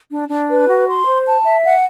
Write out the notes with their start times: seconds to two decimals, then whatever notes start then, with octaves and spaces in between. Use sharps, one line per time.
0.11 D4
0.29 D4
0.49 B4
0.68 F#4
0.87 C6
1.05 C5
1.26 A5
1.44 E5
1.64 F#5